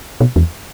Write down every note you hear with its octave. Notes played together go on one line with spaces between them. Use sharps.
B2
E2